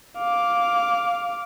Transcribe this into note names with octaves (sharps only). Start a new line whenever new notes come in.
F5 D6